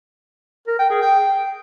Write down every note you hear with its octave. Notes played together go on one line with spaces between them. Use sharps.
A#4
G5
G#4
G5